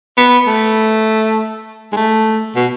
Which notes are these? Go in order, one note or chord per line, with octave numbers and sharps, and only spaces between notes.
B3
A3
G#3
A3
B2